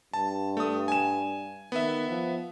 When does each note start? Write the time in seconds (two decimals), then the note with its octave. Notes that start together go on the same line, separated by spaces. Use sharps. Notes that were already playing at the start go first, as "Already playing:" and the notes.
0.14 G2 A5
0.57 A3 D#6
0.88 G#5 E7
1.72 D#3 B3 E5
2.09 F3